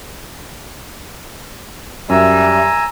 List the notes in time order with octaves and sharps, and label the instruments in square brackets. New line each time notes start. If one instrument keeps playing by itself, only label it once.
[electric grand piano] F#2 [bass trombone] G3 [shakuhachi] E5 [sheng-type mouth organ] G#5 A#5 E6